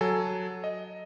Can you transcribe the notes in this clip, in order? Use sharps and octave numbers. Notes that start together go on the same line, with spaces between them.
F#3 A4 G#5
D#5